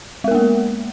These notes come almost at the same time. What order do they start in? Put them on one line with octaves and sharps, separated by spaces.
G#3 A#4 B3 A#3